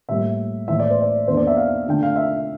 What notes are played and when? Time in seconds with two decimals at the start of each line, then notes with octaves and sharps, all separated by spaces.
0.09 A2 G3 A#3 E5
0.68 A2 E3 A#3 E4 E5
0.80 D5
0.90 C5
1.01 D5
1.28 E2 E3 A#3 D4 C5
1.37 D5
1.47 E5
1.57 F5
1.87 D3 A3 D4 G5
2.03 F5
2.16 E5